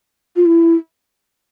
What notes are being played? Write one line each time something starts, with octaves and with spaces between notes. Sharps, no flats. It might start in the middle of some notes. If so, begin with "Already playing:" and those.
F4
E4